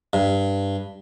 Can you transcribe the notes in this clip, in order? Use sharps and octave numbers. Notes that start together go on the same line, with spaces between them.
G2